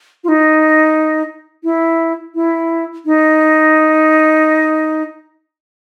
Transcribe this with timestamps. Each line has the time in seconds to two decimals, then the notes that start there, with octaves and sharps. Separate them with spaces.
0.24 F4
0.28 D#4
1.64 E4
2.35 E4
3.06 D#4